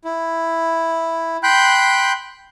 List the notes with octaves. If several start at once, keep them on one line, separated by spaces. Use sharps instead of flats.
E4
G5 B5 C6 F#6 G6